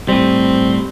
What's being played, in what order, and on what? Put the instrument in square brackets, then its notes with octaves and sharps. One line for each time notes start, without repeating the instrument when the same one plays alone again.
[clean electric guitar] A2 G3 [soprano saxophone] C4